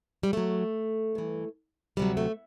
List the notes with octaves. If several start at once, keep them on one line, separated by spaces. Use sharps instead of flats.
G3
F#2 F#3 A3
G2 E3
D2 C3 F#3 G3
A3